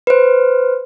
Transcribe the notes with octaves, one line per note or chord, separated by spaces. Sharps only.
B4 C5